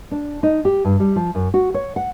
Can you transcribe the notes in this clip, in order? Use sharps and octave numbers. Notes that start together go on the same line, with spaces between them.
D4
D#4
G4
G2
G3
F3
F#2
F#4
C#5
F#5